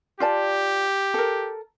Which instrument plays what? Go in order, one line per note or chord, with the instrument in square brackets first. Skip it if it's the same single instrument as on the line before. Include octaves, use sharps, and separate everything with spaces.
[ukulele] F4 D5 A5 [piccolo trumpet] G4
[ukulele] A4 A#4